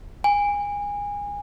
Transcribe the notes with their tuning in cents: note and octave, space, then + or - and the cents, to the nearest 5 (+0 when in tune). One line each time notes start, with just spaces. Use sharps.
G#5 -25